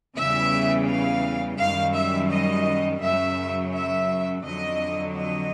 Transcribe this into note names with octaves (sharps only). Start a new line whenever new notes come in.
E2 C#3 E3 G3 E5
F5
F#2 D#3 G3 F5
E5
D#5
F#2 C#3 F#3 E5
E5
F2 D3 F#3 D#5
D#5